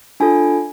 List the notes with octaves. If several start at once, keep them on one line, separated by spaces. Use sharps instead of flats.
D4 F4 A4 G#5